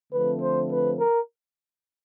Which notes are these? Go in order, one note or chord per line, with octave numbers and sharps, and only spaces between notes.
D3 F3 A3 C4 B4
C5
B4
A#4